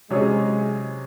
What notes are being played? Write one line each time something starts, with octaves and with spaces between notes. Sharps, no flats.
C3 F#3 G#3 C#4 G#4